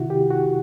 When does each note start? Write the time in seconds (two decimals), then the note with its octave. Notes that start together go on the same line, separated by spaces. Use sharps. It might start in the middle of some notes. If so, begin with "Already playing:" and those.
Already playing: C3 D#3 E4 F#4
0.10 G4
0.30 F#4